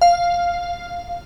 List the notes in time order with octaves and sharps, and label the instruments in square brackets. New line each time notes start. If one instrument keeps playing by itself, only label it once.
[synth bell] F5